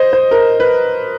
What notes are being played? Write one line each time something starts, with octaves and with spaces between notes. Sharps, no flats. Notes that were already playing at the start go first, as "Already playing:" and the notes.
Already playing: C5 D#5
C5
A#4
B4